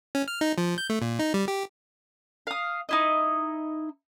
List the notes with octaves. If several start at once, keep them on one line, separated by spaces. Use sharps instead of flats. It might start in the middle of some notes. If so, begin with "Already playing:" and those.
C#4
F6
D#4
F3
G6
A3
A#2
D#4
G3
G4
F5 D#6
D#4 E4 D#5